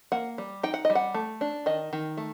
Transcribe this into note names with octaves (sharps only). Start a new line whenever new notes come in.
A#3 F#5
G3
D#4 G5
F#5
D#5
G3
F#5
A3
D4
D#3 D#5
D#3
A3